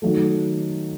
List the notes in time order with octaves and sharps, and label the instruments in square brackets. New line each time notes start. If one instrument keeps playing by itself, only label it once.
[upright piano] D#3 F#3 A3